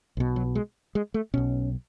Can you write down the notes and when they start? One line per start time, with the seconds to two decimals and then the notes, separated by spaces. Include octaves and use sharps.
0.17 B1 B2
0.36 F#3
0.55 G#3
0.95 G#3
1.14 A3
1.34 B1 B2 C#4